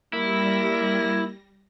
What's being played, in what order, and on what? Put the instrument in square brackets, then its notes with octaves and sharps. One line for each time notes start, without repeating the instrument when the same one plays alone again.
[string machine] G3 A#6 [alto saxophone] A#3 [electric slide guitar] E4